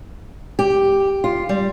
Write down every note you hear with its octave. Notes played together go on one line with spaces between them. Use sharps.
G4
F4
G3